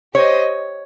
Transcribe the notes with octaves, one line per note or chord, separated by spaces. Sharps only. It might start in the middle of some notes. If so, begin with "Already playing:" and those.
G4 C5 C#5 D#5